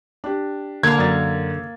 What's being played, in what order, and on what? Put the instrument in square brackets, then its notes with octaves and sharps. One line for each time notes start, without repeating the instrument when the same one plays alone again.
[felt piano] D4 G4
[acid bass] D3 [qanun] A#3 F5 [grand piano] G#6
[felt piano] F#2 D5 A6